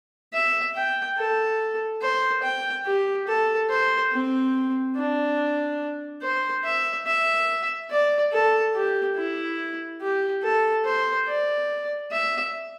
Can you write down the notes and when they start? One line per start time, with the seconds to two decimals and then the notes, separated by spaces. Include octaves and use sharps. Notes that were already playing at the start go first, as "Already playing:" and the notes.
0.34 E5
0.75 G5
1.17 A4
2.01 C5
2.43 G5
2.86 G4
3.27 A4
3.69 C5
4.12 C4
4.96 D4
6.22 C5
6.65 E5
7.07 E5
7.90 D5
8.32 A4
8.74 G4
9.17 E4
10.01 G4
10.43 A4
10.85 C5
11.28 D5
12.11 E5